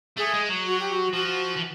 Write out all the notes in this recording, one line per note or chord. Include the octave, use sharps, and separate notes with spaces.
A3 G#4
G#3
F#3
F#4
G4
F#4
F3 F#4
E3